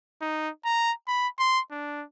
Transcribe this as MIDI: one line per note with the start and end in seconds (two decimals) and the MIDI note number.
0.22 0.49 63
0.65 0.92 82
1.08 1.28 83
1.39 1.60 84
1.71 2.04 62